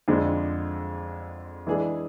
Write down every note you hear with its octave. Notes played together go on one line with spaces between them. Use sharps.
F2 D3 G#3 D4
E3 G#3 D4 G#4